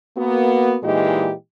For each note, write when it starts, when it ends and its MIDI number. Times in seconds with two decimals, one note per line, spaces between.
0.17 0.77 58
0.17 0.77 59
0.17 0.77 66
0.84 1.33 46
0.84 1.33 52
0.84 1.33 56
0.84 1.33 63
0.84 1.33 67
0.84 1.33 75